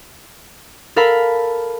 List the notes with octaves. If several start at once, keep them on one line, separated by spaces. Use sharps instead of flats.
A4 A#4 F5 B5